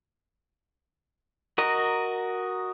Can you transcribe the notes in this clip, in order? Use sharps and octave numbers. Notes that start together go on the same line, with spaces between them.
F#4 A#4 D#5 A#5